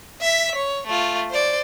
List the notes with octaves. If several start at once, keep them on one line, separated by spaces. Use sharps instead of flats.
E5 B6
C#5
A3 F4
C5 D5